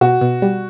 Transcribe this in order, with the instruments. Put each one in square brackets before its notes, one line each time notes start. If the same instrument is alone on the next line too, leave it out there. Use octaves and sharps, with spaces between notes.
[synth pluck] B2 [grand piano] F#4
[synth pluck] B2
G3